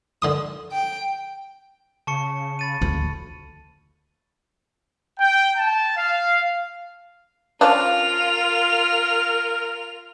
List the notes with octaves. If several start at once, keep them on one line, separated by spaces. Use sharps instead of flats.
D3 C6 D#6
G5
C#3 A5 C#6 C#7
B5 A6 D#7
D2
G5
A5
F5
F3 C#4 D4 F4 A#4 F7